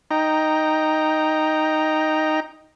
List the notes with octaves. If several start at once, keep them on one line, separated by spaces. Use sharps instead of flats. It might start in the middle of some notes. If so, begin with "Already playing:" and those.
D#4 G5 A#5